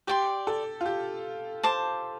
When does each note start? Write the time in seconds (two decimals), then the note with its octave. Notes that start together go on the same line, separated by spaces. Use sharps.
0.07 G4 D5 G5 C6
0.47 A4
0.81 F4
0.86 G4
1.63 C5 A5 D6